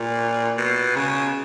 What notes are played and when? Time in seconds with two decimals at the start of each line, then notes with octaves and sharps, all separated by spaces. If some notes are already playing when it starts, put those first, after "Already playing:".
Already playing: A#2
0.58 B2
0.96 C#3